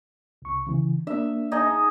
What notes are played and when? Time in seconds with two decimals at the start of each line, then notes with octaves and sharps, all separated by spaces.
0.42 C2 C#6
0.67 C#3 E3
1.07 A#3 D4 E5
1.52 D#4 G#4 D#5